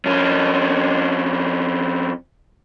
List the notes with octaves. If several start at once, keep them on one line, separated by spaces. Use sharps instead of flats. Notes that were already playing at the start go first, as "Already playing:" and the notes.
F2 C#4